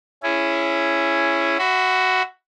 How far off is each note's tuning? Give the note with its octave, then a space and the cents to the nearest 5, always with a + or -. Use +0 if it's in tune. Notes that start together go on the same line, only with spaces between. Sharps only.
C#4 +0 E4 +15 G#4 +0
F#4 +5 E5 +0 B5 +30